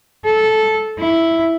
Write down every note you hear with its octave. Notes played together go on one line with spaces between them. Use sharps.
A4
E4